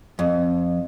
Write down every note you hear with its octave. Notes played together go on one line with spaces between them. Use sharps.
F2